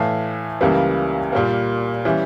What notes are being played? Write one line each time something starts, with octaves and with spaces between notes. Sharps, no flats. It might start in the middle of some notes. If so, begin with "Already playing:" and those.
Already playing: A2 E3 A3 F5
C#2 C#3 E3 G3 A#3
A#2 G3 A#3
E3 G3 C#4